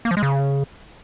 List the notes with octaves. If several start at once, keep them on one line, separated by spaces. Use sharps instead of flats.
A#3
F3
G#3
C#3